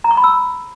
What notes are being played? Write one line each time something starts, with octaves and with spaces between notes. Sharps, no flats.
A#5
C#6
B5
E6